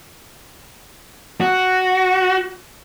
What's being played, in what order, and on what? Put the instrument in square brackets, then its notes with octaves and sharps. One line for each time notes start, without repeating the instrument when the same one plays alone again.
[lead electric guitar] F#4